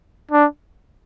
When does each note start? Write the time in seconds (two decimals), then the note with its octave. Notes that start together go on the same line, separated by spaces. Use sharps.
0.31 D4